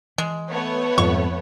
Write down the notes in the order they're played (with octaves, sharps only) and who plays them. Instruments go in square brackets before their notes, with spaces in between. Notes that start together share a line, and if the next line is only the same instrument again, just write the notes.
[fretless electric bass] E3 [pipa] G#3
[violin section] A3 B3 C#5
[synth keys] F2 [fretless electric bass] G#2 G3 G#3 [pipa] C#6